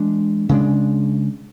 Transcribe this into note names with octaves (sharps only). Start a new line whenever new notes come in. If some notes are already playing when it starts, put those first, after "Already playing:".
Already playing: E3 G#3 D4
C#3 G#3 D4